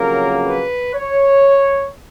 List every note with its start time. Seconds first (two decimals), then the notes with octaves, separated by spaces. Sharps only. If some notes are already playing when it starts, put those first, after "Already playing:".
Already playing: F2 C#3 F#3 A#3 A#4
0.42 B4
0.94 C#5